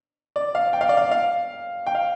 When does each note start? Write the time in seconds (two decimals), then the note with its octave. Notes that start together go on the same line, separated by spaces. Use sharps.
0.36 D5
0.55 F5
0.73 G5
0.81 F5
0.89 D5
0.97 F5
1.11 F5
1.87 G5
1.95 F5